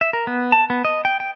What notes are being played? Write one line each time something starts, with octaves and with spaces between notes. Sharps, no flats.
E5
A#4
B3
A5
B3
D#5
G5
G5